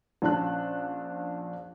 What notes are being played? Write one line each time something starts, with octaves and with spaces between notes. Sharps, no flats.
A#1 C#4 D4 F4 A5 F#6